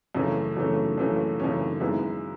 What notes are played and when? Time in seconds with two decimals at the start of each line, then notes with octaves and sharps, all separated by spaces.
0.15 F#2 C#3 E3 A3 C#4
0.57 F#2 C#3 E3 A3 C#4
0.98 F#2 C#3 E3 A3 C#4
1.40 F#2 C#3 E3 A3 C#4
1.80 F#2 D#3 G#3 B3 E4